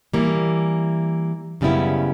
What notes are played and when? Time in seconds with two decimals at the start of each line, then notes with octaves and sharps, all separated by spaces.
0.13 E3 G3 A#3
1.61 F#2 C#3 G3 B3 E4